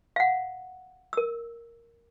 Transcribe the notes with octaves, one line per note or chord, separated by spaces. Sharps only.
F5 F#5
A#4 E6